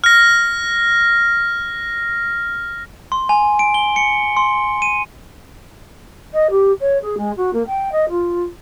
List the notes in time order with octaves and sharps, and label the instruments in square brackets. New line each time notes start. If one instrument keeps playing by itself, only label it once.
[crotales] F6 A#6
[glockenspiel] C6
G#5
D7
G7
C#7
C6
D#7
[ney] D#5
G4
C#5
G#4
G#3
F#4
A#3
G5
D#5
F4